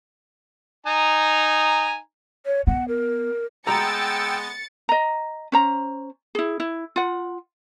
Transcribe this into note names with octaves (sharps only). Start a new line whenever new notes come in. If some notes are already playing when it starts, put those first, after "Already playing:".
D#4 G#5 A#5
C#5
B3 F#5
A#4
G#3 B3 G5 A#5 E6 A6 C#7
D#5 A#5
C#4 C5 A#5
E4 G#4
E4
F4 F#5